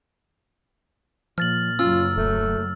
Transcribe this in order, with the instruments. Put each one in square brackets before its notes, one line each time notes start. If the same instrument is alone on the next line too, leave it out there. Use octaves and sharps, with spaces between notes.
[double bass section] A#2 [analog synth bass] F3 [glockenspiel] F6 A6 F#7
[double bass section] F#1 F#3 [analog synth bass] C#4 [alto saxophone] F4 [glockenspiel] E6
[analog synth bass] D#1 [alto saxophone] A3